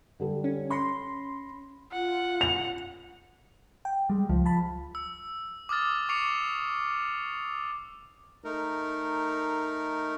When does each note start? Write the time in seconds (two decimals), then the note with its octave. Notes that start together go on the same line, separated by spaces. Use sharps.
0.20 D3 G3 A4
0.44 C#4
0.70 B5 C6 A#6 C#7
1.92 F4 F#5
2.41 F7
3.85 G5
4.10 G3 G#3
4.29 C#2 F3
4.46 A5 B5
4.95 E6
5.69 D6 D#6 F6 A6
6.09 C#6 D6 C7 C#7 F7
8.44 A3 D#4 A#4